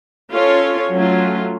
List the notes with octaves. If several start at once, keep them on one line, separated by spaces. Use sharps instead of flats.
C#4 F4 A4 C#5
F#3 A3 C#4 F4